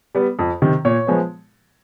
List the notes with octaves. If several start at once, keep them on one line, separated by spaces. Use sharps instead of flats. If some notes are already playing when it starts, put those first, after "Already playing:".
G3 B3
F2
C3 D#3
A#2 C#5
F3 G#3 B3